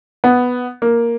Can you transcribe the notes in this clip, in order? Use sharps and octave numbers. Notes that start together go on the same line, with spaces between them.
B3
A#3